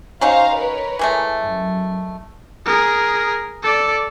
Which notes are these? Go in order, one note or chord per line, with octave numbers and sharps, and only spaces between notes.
F#3 C#4 D#4 C5 F5 A#5
A#4 B4 C#5
E3 G#3 A3
F#2
G#4 A#4
A4 D5